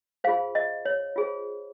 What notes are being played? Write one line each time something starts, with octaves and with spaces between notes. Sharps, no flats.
F4 G#4 C5 F5
D#5
C#5
F4 G#4 C5